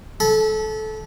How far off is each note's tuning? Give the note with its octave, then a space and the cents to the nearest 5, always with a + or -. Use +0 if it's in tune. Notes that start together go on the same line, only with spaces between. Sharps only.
A4 -20 B5 -30